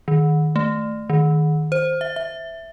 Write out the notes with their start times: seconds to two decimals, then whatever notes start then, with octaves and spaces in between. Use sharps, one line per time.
0.08 D#3
0.56 A3
1.10 D#3
1.72 C5
2.01 E5
2.16 E5